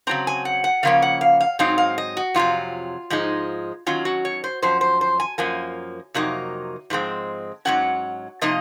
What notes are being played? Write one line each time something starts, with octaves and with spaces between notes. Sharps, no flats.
C#3 F#3 C4 A#5
G#5
F#5
F#5
C#3 F3 A#3 C#4 F5
F#5
F5
F5
G#2 F#3 C4 D#4 F5
F5
D#5
F#4
F2 C3 F#3 F4
G#2 F3 G#3 D#4
D#3 F#3 C#4 F4
F#4
C#5
C5
F#2 F3 C5
C5
C5
G#5
F#2 F3 A#3 G#5
F2 C3 F#3 A#3 D#4
G#2 F3 G#3 C4
G#2 D#3 F#3 C#4 F#5
C3 F3 A#3 D#4 D#5